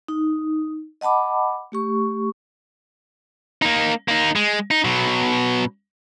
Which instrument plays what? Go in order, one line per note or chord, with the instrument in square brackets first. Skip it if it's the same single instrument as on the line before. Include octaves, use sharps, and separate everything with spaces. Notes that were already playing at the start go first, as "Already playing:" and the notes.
[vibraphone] D#4
D#5 F#5 A5 B5 D6
A3 G4 C#6
[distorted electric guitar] A#3 D#4
A#3 D#4
G#3
D#4
B2 F#3